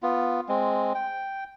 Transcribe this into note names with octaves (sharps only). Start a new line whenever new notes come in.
B3 F4
G#3 C4
G5